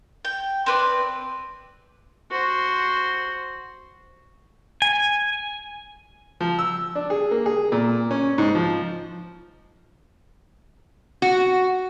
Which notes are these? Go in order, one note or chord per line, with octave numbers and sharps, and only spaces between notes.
G5
C4 B4 D5
F#4 C5
G#5
F3
E6
D4
G#4
A#3
G#4
A#2
C#4
G#2
F3
F#4